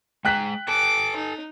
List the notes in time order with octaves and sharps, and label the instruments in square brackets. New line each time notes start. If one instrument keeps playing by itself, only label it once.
[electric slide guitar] G#3 A#5 [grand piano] G5 F#6 B6
[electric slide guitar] A4 G#5 A5 [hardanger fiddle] D6
[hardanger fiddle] D#4